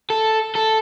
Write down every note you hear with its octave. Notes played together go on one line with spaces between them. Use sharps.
A4
A4